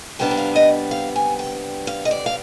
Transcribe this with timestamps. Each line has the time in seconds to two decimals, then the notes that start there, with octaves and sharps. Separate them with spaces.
0.19 C3 G3 B3 D4 G5
0.31 G5
0.37 F5
0.55 D#5
0.91 F5
1.16 G#5
1.39 G5
1.87 F5
2.05 D#5
2.11 D5
2.26 F5